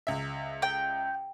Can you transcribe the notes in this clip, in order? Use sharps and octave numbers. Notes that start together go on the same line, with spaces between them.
C#2 E5
G5